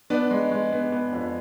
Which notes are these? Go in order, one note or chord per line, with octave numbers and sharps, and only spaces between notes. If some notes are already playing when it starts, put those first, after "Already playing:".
B3 D4
G#3
G#3
B3
B3
F2